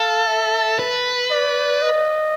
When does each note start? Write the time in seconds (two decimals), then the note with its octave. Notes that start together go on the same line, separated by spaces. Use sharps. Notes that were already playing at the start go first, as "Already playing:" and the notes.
Already playing: A4 F5
0.27 E5
0.79 B4
1.31 D5
1.82 D#5